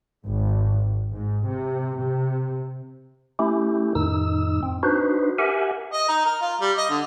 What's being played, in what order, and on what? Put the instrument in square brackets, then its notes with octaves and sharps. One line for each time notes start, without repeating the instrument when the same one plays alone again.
[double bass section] G#1
G#2
C3
C3
[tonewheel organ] A3 C#4 E4 G4
F2 A2 D#3 D#4 E6
C4
D4 D#4 F#4 B4 C5
G4 A#4 E5 F#5 G#5
[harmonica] D#5
D#4
A#4
F4
G3
D#5
D3